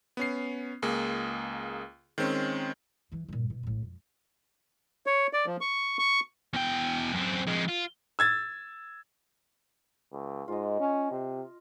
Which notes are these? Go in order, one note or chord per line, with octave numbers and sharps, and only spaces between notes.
B3 C#4 C7
C#2 A#3 G#4
D#3 G#3 C4 C#4
E2 E3
G2 A#2
B2
A1 A2
F2
C#5
D5
F3
C#6
C#6
E2 G5
F#2 C4
F2 G#3
F4
E6 G#6 A6
C#2
G#2 F4 D#5
C#4
C3